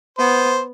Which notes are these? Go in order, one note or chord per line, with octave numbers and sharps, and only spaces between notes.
B3 C5